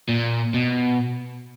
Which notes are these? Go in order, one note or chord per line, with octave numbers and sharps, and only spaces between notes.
A#2
B2